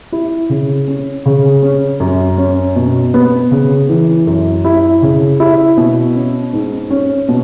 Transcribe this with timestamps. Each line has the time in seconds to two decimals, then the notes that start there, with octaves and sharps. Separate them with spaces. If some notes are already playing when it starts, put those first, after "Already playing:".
0.12 E4
0.50 C#3
0.88 C#4
1.26 C#3
1.63 C#4
2.00 F#2
2.38 C#4
2.76 B2
3.14 B3
3.51 C#3
3.89 E3
4.27 F#2
4.65 E4
5.02 C#3
5.40 E4
5.77 B2
6.16 C#4
6.53 G#2
6.91 C#4
7.29 B2